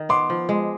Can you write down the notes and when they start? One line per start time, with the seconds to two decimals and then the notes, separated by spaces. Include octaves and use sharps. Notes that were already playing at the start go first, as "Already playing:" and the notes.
Already playing: D#3
0.09 B3 C6 D6
0.30 F3
0.49 G#3